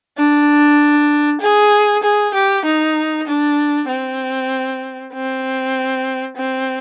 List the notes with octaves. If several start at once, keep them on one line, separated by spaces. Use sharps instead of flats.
D4
G#4
G#4
G4
D#4
D4
C4
C4
C4